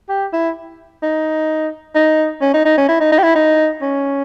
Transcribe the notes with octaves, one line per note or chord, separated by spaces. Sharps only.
G4
E4
D#4
D#4
C#4
D#4
D#4
C#4
E4
D#4
D#4
G4
E4
D#4
C#4